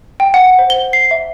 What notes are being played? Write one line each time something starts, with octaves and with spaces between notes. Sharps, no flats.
G5
F#5
C5
G7
C7
E5